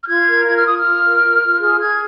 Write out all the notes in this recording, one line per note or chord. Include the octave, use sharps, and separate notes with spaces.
F6
F4 G#6
A#4
F4 G#6
F6
F4 D#6
F6
F4
A#4
F4
F4
G#4 F6
G#4 G#6